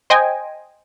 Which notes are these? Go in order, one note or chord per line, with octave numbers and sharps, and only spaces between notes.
C5 D#5 G5 G#5